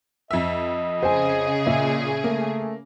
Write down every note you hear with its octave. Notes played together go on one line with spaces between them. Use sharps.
F2 D#5 E5
C#3 G#4 C5 G#5
A#2 E5
A3 A#3